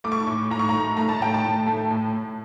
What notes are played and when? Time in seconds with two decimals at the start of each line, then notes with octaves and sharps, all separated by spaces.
0.04 A3 D6
0.12 C#6
0.20 D6
0.27 A2
0.50 A2 A#5
0.59 C#6
0.69 A3 A#5
0.97 A3 A#5
1.09 A5
1.20 A2 G5
1.34 A5
1.44 A2
1.66 A3
1.91 A2
2.13 A2